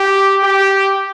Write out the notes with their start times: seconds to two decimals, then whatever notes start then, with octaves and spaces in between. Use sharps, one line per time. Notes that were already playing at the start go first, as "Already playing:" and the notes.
Already playing: G4
0.43 G4